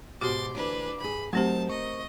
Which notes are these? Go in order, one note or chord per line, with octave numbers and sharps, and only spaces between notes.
G#2 B2 F#4 G4 C6 D6 A6
D2 E3 D4 B4
G2 G#4 B5
F#3 A3 C4 D#4 G4 A#4 C5 A5
D#5 C#6